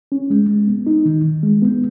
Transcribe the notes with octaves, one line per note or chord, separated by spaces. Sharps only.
C#4
G#3
G#3
B3
D#4
D#3
D#3
G#3
B3